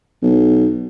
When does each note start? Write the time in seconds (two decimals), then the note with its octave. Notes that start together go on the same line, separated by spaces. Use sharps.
0.22 B1